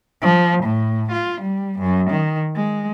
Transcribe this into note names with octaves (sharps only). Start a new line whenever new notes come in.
F3
A2
F4
G3
F#2
D#3
G#3